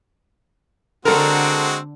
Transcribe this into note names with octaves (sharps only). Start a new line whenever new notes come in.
D3 G#3 C4 F#4 A4 A#4